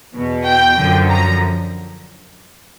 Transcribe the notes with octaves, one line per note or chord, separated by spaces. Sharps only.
E2 B2
G5
F#2 D3 F3
A#5